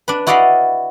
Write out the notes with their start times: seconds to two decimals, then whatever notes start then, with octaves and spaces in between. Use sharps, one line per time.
0.08 D4 B4
0.27 E4 F#4 D5 D#5 F5 B5